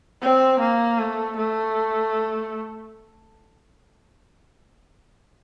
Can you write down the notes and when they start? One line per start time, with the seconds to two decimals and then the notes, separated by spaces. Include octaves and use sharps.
0.22 C4
0.60 A#3
0.99 A3
1.37 A3